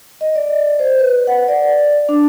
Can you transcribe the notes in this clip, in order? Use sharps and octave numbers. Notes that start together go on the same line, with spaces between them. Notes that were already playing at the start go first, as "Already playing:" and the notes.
D#5
D5
C5
B4
F#5
D5
D4